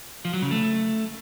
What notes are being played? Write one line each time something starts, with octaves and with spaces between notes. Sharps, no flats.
F3
F#3
C#3
A3